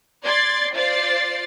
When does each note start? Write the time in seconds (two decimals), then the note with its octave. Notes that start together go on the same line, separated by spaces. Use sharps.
0.24 D5 C6 G#6 A6 C7
0.74 F4 C5 D5 A6 C7